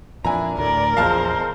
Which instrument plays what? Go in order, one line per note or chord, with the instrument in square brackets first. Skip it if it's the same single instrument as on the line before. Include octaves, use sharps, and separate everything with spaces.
[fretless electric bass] F2 A#2 E3 [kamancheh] D4 E4 [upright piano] G#5 A#5
[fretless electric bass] D2 A2 [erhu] A#4 [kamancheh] D5
[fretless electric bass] A#1 E2 A#2 [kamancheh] G#3 C5 [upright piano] F5 A5 F6